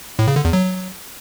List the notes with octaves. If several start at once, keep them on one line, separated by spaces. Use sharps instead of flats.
A2
C#3
D3
E2
F#3